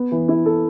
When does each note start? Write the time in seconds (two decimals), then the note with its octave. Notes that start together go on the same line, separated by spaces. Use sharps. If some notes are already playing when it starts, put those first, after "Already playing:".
Already playing: B3
0.12 E3
0.28 E4
0.46 A4